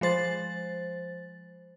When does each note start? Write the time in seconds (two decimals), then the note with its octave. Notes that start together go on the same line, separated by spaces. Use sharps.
0.01 F3 G#3 C5 A6